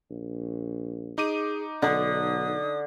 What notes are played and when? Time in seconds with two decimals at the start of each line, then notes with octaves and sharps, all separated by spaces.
0.10 A#1
1.18 D#4 G#4 D6 D#7
1.82 B1 D3 D#6